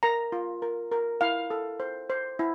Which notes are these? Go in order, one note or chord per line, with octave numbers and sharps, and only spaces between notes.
A#4 A#5
F4
A#4
A#4
E4 F5
A4
C5
C5
E4